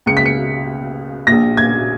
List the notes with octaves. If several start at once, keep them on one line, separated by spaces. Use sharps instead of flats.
C#2 C#3 C#7
B6
C#7
A#1 A#2 A#6
G#6